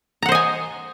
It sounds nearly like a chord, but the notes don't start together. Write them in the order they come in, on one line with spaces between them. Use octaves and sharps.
A#5 F#5 C5 D#5 G#5